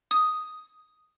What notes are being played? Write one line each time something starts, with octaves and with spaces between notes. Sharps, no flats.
D#6